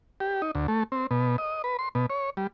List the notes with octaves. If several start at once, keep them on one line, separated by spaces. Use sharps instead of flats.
G4
D#4
D2
A3
C4
B2
D#5
B4
C6
B2
C#5
G3